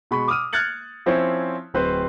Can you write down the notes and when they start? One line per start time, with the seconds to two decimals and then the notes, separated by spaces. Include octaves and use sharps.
0.11 B2 G#3 B5 C#6
0.28 D6 D#6 F6 D#7
0.53 F6 F#6 G#6 A6 C#7 F#7
1.06 F3 C4 C#4 E4 C5 C#5
1.74 D1 C4 B4 C5